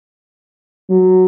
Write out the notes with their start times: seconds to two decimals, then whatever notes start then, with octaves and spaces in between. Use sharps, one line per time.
0.90 F#3